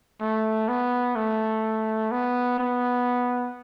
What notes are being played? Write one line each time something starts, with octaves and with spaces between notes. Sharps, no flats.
A3
B3
A3
B3
B3